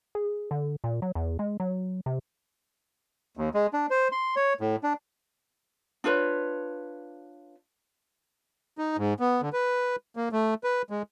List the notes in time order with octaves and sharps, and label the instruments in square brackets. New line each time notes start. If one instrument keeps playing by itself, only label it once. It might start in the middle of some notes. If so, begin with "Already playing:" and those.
[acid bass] G#4
D3
A#2
F#3
E2
G#3
F#3
C3
[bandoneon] D#2
G#3
D4
C5
C6
C#5
A2
D4
[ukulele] D4 F4 B4 C#5
[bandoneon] D#4
G#2
B3
D3
B4
A#3
A3
B4
G#3